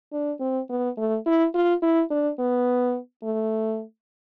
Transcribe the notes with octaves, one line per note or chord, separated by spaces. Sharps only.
D4
C4
B3
A3
E4
F4
E4
D4
B3
A3